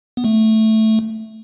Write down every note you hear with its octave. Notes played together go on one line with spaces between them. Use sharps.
B3
A3